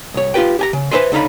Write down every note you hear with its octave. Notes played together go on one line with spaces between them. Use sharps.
C2 C#5
F4 G4 B4 G5
G4 G#5 A#5
C#3
B4 C5 D#5 E5 G#5 C6
C#2 D3 D#4 F5 B5